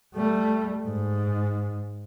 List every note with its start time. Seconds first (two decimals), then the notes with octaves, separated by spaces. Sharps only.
0.14 G3 A3
0.86 G#2